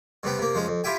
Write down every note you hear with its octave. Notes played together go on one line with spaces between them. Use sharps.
G2 C3 B3 G5
C3 A#3
F3 G#3 C#4
F2
E4 F4 G4 E5 G5 G#5